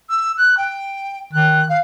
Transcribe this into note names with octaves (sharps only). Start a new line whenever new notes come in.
E6
F#6
G5
D#3 F#6
F5